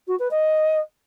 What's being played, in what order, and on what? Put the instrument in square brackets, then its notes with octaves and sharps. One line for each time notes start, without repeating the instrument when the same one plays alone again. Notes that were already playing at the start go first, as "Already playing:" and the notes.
[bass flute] F#4
B4
D#5